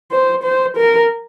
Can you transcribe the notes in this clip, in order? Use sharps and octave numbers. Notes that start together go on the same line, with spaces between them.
C5
C5
A#4